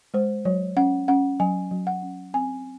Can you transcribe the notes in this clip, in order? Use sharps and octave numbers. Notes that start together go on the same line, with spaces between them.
G#3 C5
F#3 C#5
C#4 F#5
C#4 F#5
F#3 G#5
F#3
F#5
C#4
C4 G#5